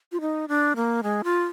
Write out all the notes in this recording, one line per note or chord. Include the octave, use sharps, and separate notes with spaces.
F4
D#4
D4
A#3
G#3
F4